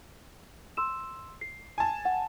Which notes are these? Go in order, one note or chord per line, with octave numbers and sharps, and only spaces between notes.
C6 E6 E7
C7
G#5 A5
F#5